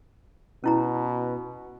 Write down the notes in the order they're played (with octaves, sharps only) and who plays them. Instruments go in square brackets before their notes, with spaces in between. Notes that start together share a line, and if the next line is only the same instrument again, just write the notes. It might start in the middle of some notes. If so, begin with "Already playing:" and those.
[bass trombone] B2 [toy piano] C#4 E4 A#5